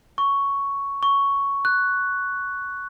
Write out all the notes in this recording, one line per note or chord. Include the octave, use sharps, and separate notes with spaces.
C#6
C#6
F#6